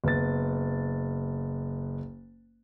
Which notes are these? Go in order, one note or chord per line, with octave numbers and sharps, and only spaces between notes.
F#1 B3 A6